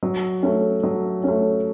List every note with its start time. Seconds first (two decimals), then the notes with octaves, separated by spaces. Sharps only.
0.03 F#3
0.43 A3 C#4
0.84 F#3
1.24 A3 C#4